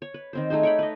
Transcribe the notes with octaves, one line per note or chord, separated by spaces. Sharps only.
C#5
B4
D#3 C4 C5
A3 D#4 G#4 C5
C#5 G5 B5
B4 C#5 D#5